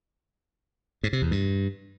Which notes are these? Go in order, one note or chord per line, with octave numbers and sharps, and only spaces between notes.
G#2
C3
E2
G2